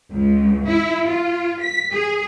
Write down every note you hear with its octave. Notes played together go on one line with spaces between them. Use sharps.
C#2
E4
F4
B6
G#4